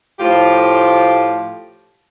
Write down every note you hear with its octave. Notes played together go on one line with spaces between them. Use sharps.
A2 F3 F4 G4